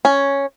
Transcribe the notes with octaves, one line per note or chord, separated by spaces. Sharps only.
C#4